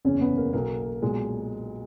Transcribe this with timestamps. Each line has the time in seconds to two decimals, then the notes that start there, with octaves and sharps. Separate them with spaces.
0.05 F#1 E2 C#3 C#4
0.21 B3
0.37 A#3
0.53 B1 B2 A#3
1.02 B1 A#2 G#3